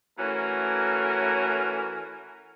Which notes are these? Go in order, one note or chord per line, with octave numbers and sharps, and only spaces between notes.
E3 A3 C#4 F#4 A#4